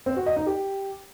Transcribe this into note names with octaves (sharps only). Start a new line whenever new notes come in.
C4
F#4
D#5
D#4
G4